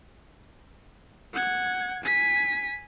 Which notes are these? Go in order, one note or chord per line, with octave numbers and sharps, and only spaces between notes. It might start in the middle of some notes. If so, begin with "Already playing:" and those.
F#5 G#6
G#5 B6